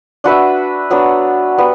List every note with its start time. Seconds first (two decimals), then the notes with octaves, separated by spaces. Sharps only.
0.24 D4 F#4 B4 E5
0.90 F#3 B3 D4
1.58 G3 B3